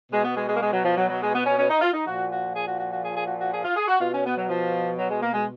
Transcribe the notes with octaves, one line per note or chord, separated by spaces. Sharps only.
B2 G#3
B3
G#3
G#3
A#3
G#3
F#3
F3
F#3
F#3
G#3
B3
C#4
C#4
D#4
F4
D#4
A#2 F3 F#4
F#4
G#4
F#4
F#4
F#4
G#4
G#4
F#4
F#4
G#4
F4
G#4
F#4
B2 F4
C#4
B3
F#3
F3
F#3
G#3
A#3
G#3